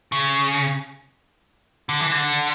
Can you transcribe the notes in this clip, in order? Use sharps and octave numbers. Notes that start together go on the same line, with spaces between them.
C#3
D3
E3
D3